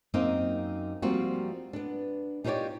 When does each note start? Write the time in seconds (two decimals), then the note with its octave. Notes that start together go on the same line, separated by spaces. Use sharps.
0.14 F#2 A#3 C4 D#4 D#5 F5
1.02 F3 G3 A#3 C4 F4 F#4
1.73 B3 D4
2.44 D#4 F4 G4 G#4 C#5 D5